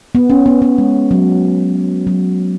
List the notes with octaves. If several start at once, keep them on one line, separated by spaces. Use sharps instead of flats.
B3
C#4
B3
B3
G#3
F#3
F#3